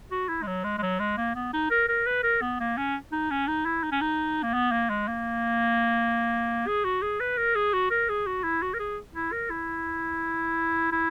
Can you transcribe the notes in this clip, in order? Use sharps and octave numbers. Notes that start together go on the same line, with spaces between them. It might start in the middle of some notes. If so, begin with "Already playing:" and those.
F#4
E4
G#3
F#3
G#3
G#3
F#3
G#3
A#3
B3
D#4
A#4
A#4
B4
A#4
B3
A#3
C#4
D#4
C#4
D#4
E4
D#4
C#4
D#4
A#3
B3
A#3
G#3
A#3
G#4
F#4
G#4
B4
A#4
G#4
F#4
A#4
G#4
F#4
E4
F#4
A#4
G#4
E4
A#4
E4
E4